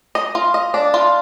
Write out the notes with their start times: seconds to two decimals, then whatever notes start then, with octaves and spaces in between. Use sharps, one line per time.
0.15 D#5
0.35 F4
0.54 D#5
0.74 D4
0.94 F4